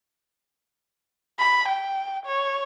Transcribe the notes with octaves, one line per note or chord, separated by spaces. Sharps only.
B5
G5
C#5